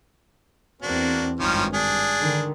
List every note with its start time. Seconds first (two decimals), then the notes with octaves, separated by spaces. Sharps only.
0.82 E2 A#3 C4 D4 F#4
1.40 G#1 G2 D#3 F3 C#4
1.73 D4 G#4
2.20 D3 D#3